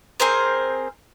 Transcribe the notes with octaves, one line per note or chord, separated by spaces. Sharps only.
C4 G#4 A#4 C5